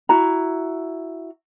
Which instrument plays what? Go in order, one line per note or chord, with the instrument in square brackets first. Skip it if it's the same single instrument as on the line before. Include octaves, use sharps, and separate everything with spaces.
[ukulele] E4 F#4 A#5